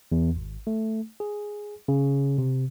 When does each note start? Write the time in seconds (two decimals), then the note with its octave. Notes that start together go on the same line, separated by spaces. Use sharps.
0.12 E2
0.36 G#1
0.67 A3
1.20 G#4
1.88 C#3
2.38 C3